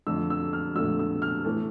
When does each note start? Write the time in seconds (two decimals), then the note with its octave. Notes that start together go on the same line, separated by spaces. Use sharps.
0.07 F2 D3 A3 E6
0.30 E6
0.53 F6
0.76 F2 D3 A3 E6
0.99 E6
1.22 F6
1.45 A2 E3 A3